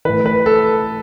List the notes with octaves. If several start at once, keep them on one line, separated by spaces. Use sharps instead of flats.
A2 E3 B4
B4
A4